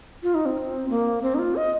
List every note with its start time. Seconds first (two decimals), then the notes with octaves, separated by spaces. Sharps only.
0.23 F4
0.35 D#4
0.46 C4
0.90 A#3
1.22 C4
1.35 D#4
1.39 F4
1.56 D#5